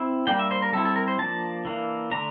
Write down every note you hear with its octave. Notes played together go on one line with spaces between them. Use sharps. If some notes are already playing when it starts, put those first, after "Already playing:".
Already playing: C4 E4
G3 A#3 D4 G5
E5
C5
A#4
G3 C4 E4 A4
A4
A#4
C5
F3 A#3 D4 A5
E3 A#3 D4
D3 A3 D4 A#5